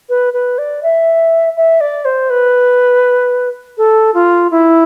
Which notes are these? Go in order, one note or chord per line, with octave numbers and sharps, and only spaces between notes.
B4
B4
D5
E5
E5
D5
C5
B4
A4
F4
E4